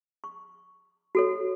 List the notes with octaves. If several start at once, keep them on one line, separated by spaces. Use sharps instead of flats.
C#6
F#4 A4 C#5